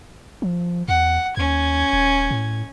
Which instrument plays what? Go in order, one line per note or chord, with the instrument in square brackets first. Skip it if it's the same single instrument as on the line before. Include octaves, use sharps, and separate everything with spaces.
[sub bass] F3
[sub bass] E2 [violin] F#5
[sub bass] D#2 [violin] C#4 G#6
[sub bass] D#1
A2